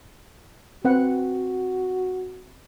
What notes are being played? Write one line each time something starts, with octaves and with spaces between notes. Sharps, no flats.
C4 F#4 B4 F#5